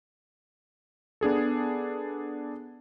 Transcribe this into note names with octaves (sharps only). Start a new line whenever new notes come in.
B3 D4 G#4 A4